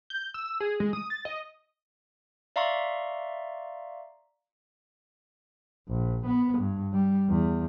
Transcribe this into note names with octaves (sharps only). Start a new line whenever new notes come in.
G6
E6
G#4
G#3
D#6
A6
D#5
D5 E5 F5 A#5 C6 C#6
A#1
B3
G2
G3
E2